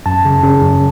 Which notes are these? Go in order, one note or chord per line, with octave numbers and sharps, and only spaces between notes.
F#2 A5
C#3
C#3
F#2